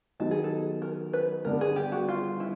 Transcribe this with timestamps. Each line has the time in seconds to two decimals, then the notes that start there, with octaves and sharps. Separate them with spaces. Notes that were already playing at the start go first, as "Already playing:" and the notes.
0.20 D#3 F#3 B3 D#4 G4 A4
0.31 G#4
0.44 A4
0.82 A#4
1.13 B4
1.45 G2 D3 G3 B3 D4 A#4
1.61 G#4
1.76 G4
1.92 F#4
2.09 F4
2.40 E4